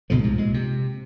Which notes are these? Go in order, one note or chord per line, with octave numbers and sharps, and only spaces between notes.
C#2 B2 D3 F3
C2 G#2 C3
A#2 G#3
C3